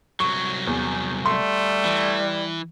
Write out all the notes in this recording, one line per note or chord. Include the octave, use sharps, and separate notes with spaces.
C2 F#3 C#6
E2
G3 A3 C6
E3